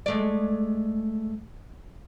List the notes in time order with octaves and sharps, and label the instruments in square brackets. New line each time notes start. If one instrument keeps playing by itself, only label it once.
[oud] G#3 A3 D5